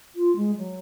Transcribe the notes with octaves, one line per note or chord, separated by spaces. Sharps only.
F4
G#3
F#3